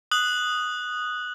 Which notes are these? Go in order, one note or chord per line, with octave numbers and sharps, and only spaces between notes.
D#6 F#6 F#7